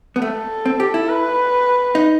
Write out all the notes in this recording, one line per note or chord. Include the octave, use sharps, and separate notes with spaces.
B3
A3 A4
C4
G4
E4
B4
D#4